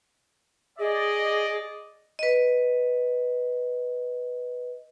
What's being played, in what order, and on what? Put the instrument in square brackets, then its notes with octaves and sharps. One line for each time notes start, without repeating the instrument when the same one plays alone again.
[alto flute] G#4 [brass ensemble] D5 D#5
[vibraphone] B4 D#5